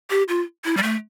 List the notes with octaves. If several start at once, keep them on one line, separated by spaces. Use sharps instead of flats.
G4
F4
E4
G3
A3